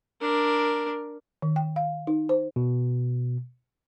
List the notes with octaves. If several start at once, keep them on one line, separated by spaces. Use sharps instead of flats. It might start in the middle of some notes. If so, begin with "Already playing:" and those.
D4 A#4
D#3
G5
F5
D#4
C5
B2